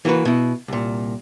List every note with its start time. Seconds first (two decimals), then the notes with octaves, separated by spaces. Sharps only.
0.05 E3 A#3 F#4 A#4 B4
0.25 B2 E4
0.68 C2 A#2